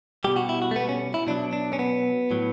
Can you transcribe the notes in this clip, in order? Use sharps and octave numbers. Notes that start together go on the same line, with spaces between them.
B2 G3 G4
F#4
E4
F#4
A3
B3
C#4
E4
B2 F#3 D4
D4
C#4
B3
A2 F#3